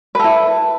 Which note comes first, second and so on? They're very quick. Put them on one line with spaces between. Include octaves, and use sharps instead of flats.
B4 A4 E4